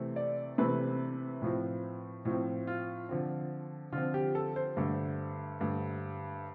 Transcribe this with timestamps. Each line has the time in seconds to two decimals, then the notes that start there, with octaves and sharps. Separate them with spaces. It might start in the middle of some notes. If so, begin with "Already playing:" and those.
Already playing: C3 E3 A3 C4
0.16 D5
0.58 C3 E3 A3 C4 B4
1.42 A2 F3 C4
2.25 A2 F3 C4
2.67 F4
3.09 D3 F3 C4
3.92 D3 F3 C4 F4
4.14 G4
4.35 A4
4.56 C5
4.77 G2 D3 A3
5.61 G2 D3 A3